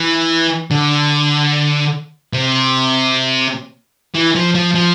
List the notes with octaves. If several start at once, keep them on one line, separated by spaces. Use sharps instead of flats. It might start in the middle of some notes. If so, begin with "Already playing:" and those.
Already playing: E3
D3
C3
E3
F3
F3
F3